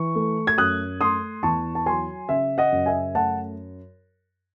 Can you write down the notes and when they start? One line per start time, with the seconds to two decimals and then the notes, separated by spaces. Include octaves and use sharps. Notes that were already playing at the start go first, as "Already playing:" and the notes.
Already playing: E3 C#6
0.15 A3
0.47 G#6
0.58 F#2 D#6 F#6
1.01 A3 C6 D#6
1.43 E2 A5 C#6
1.75 A5
1.86 F#3 G#5 C6
2.29 C#3 E5
2.58 D#5 F#5
2.72 F#2
2.86 E5 G#5
3.15 A3 F#5 A5